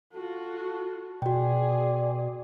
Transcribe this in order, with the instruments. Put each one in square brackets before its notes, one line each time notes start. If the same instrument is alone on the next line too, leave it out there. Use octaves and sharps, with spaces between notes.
[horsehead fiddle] F4 F#4 [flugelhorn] A4
[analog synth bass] B2 [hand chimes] F#4 G5 [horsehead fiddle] G#4 [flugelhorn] D5